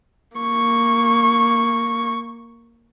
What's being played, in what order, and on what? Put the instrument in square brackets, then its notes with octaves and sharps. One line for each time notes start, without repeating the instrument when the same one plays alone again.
[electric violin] A#3 C#6